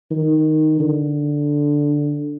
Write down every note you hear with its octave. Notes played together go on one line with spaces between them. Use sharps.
D#3
D3